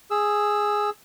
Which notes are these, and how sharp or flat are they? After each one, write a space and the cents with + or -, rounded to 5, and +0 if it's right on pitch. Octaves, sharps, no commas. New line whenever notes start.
G#4 +0 E6 +0